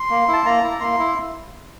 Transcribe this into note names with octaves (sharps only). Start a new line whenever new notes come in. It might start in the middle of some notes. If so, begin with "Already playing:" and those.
Already playing: C6
A#3
E4
A5
A#3 A#5
E4
A#3 C6
E4